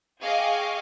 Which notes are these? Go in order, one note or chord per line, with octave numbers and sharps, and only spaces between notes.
G#4 D#5 F5 G5 C#6 D6